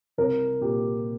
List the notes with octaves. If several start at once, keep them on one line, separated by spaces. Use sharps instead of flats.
C2 A#4
A#2 G4